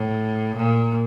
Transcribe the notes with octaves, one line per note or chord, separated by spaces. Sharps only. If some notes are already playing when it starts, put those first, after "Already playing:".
Already playing: A2
A#2